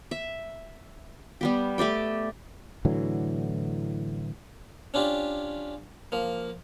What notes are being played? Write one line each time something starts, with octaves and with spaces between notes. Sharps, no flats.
E5
G3 B3 G4
A3 G4 D5 G5
A2 D3 E3 F#3
C#4 D4 F4 G4
F3 A#3